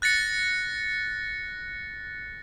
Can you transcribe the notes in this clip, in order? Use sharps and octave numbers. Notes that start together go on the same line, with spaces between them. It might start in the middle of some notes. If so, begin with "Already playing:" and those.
F#6 A6 A#6 C#7